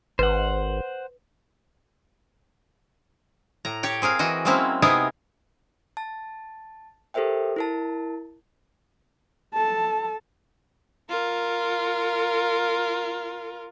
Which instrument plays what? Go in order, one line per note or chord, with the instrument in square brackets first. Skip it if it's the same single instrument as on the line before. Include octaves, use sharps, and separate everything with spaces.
[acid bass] G#1 [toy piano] B4 [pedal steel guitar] C5 F#5
[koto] A2 A#5
G4 C#5 G5
C4 G#4 A#4 F5
E3 F#4 D#5
F#3 G#3 A#3 C4 C#4 E4
C3 B3 D#4 E4 G#4 A#4
[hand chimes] A5
G4 A4 A#4 C5 E5 G5
E4 A#4 A5
[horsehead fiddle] A4 A5
[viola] F4 A#4